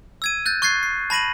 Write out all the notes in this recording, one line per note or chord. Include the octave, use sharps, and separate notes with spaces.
E6 G#6 D#7
F#6 G6 A6
C#6 F#6 G#6 A6 C7
C7
A5 B5 A#6 D#7 F#7